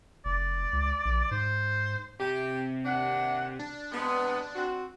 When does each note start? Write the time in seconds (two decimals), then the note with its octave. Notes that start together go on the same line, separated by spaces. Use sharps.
0.25 F1 D5
0.73 C#2
1.05 A#1
1.31 G#2 C5
2.20 C3 G4
2.85 D#2 D4 F#5
3.59 D4
3.92 C3 G#3 B3
4.55 C4 F#4